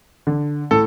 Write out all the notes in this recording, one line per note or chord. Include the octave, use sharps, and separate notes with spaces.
D3
A2 A4